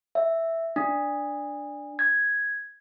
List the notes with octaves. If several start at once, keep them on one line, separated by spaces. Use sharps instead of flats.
E5
D4
G#6